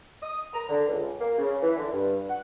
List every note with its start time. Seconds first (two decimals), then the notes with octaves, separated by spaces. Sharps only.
0.23 D#6
0.54 A#5
0.69 D3
0.87 C#2
1.20 A#3
1.38 C#3
1.62 E3
1.77 D3
1.92 G2
2.29 F#5